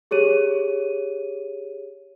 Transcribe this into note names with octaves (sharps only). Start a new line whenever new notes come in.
G4 G#4 C#5 D#7